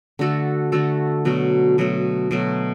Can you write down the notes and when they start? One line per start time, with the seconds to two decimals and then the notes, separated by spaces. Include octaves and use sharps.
0.19 D3 A3 F#4 A4
0.72 D3 A3 F#4 A4
1.25 B2 F#3 A3
1.78 B2 F#3 A3
2.31 B2 F#3 A3